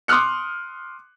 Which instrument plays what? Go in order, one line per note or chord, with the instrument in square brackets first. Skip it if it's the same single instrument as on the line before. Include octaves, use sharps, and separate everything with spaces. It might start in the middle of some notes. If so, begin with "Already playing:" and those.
[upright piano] C6 D6 D#6 F6 F#6 C#7